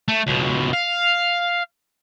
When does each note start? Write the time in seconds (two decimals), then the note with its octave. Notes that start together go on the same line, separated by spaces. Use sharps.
0.08 A3
0.27 C#2 B2
0.73 F5